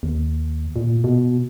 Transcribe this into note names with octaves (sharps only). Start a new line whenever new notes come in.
D#2
A#2
B2